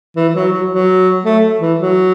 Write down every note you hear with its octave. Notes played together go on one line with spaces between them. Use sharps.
E3
E3
F#3
F#3
F#3
A3
E3
F#3